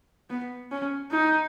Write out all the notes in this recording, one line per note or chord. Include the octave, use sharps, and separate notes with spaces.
B3
C#4
D#4